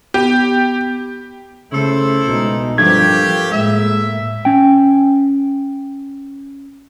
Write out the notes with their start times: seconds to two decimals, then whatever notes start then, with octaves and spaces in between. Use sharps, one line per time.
0.14 B3 G4
1.72 C#3 A3 E4 A4 C5
2.27 B2 G#3 D#4
2.78 G2 F3 A3 A#3 C4 G4 G#6
3.51 A2 G#3 A#3 E5
4.45 C#4 G5